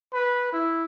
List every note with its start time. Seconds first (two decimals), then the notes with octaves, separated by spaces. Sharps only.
0.13 B4
0.52 E4